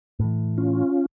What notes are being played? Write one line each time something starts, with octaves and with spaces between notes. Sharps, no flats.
A2 E3
C#4 F4